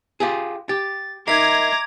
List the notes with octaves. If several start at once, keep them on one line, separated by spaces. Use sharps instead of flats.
F4 G4 G#4
G4 A6
D#4 A#4 E5 A#5 D6 G#6 C7